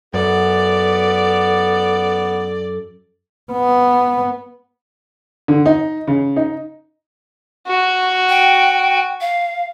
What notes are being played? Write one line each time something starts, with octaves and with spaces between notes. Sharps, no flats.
F#2 B3 A4 D5
B3
D3
D#4
C#3
D#4
F#4
G5
F5